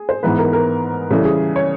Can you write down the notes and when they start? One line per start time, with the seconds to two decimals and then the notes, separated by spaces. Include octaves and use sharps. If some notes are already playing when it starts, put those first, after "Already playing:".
Already playing: G#4
0.09 C5
0.23 G#2 E3 G#3 B3 B4
0.38 A#4
0.53 A#4
1.11 C#3 E3 G3 A4
1.25 G#4
1.56 C#5